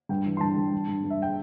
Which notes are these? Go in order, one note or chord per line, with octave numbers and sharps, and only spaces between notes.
G2 G5
E3
C6
G2 A5
G2
G2
G2
G2
E5
G5